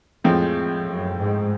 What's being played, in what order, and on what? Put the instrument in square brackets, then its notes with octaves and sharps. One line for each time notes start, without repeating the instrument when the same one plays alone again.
[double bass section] F2 [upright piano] A2 F3 G#3 C4
[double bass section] F#2
G#2